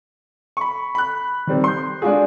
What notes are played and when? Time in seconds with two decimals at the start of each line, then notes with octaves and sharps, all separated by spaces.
0.57 B5 C#6
0.95 B5 F#6
1.47 D#3 G3 C4
1.64 C6 G6
2.02 G#3 D4 F4 F#4 G#4